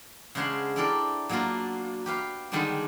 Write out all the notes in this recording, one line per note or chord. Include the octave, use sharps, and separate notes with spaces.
C#3 G#3 D4 C5 C#5 F#5
D4 E4 G4 A4 A#4 D5
F#3 A#3 B3 D4 F4
G4 B4 F5
D3 D#3 G3 G#3 B3 D4